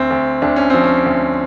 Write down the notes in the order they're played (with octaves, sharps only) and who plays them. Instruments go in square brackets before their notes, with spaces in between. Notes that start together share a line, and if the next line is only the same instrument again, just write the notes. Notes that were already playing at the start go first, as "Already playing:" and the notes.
Already playing: [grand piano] D2 C4
D2
D2 D4
C#4
F3 C4
C#4
D2